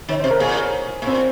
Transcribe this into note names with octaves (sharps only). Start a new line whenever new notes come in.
D#3 C#5
C3 C5
A#4
A#2 G#4
A#2 C4